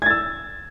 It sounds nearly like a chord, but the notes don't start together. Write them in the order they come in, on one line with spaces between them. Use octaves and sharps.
G#6 A6 E6